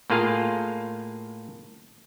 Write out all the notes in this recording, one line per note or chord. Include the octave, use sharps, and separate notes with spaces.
A2 A#3 F4 G#4 F5